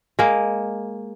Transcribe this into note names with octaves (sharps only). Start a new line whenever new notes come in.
G#3 A#3